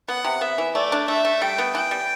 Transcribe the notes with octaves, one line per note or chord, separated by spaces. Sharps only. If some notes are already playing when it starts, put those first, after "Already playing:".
B3 F#5
C3
B3 E5
E3
A3 D5
D4
A3 E5
A3
G3 G5
B3
E3 G5
G3